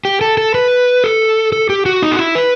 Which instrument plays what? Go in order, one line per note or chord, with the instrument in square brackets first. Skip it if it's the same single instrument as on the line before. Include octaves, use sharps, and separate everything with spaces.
[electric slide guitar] G4
A4
A4
B4
A4
A4
G4
F#4
D#4
F#4
E4
B4